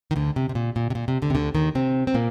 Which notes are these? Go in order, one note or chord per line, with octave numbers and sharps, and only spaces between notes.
D#3
D2 D3
C3
C3
A#2
A#2
C3
A#2
C3
D2 D3
C3
D2 D3
D#2 D#3
C3 C4
C4
A#2 A#3